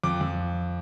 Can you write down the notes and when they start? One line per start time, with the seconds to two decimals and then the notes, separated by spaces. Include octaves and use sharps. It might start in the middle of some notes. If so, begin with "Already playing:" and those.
0.03 F2 D6
0.21 F2